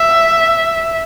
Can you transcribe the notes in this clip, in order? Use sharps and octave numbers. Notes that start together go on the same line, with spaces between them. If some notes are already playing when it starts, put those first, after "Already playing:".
Already playing: E5